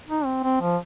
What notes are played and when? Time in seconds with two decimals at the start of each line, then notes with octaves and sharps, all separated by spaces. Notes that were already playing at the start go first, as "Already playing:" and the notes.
0.09 D#4
0.25 C4
0.44 C4
0.61 F3